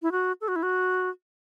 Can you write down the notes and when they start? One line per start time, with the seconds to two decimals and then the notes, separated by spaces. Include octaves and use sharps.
0.02 E4
0.12 F#4
0.41 A4
0.48 F#4
0.56 E4
0.63 F#4